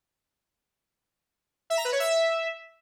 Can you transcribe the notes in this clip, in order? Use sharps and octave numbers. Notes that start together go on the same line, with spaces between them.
E5
A#5
B4
C#5
E5